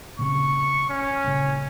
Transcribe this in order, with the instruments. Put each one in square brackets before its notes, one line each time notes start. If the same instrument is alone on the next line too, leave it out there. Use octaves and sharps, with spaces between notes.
[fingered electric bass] A#2 C#3 C4 [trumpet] C#6
[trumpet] C#4
[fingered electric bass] G1 A#2 C#3